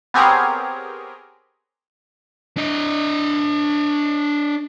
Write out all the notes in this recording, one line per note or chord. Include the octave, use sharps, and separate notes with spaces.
B3 C4 G4 G#4 A#4 C#5
D4 D#5